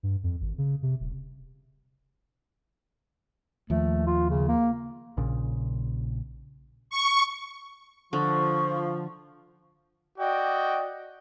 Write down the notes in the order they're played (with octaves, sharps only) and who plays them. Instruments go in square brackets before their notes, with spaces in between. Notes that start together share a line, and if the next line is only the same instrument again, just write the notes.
[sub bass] G2
F2
G#1
C#3
C3
D#1
[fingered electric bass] D#2 F3 [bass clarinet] A3
[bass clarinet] F4
C#3
A#3
[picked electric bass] A#1 A#2 C#3
[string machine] C#6
[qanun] D3 [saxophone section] F3 [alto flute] C#6
[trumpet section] F#4 D5 D#5 G5